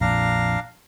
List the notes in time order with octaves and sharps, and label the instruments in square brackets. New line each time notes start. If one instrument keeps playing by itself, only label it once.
[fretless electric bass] A#1 F2 A#2 [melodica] D4 F5 A#5